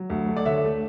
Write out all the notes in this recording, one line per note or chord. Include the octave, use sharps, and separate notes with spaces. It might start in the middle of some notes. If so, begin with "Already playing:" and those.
Already playing: F#3
D2
A3
D5
D3 C#5 E5
A3